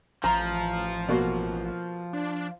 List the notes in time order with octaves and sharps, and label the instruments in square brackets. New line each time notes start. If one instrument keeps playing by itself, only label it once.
[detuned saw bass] A1 [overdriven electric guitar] F3 [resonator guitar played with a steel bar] A#5
[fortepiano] B2 A#3 F#4
[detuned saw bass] D4